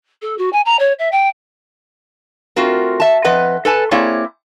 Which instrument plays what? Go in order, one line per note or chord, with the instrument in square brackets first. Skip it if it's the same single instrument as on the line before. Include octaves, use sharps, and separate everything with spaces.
[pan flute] A4
F#4
G#5
A#5
C#5
E5
G5
[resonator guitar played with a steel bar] A3 C4 F4 F#4 A#4
E5 A5
F2 B4 D#5 F#5
A4 B4 G#5 A5
A#3 C4 E4 G#4 C#5 D5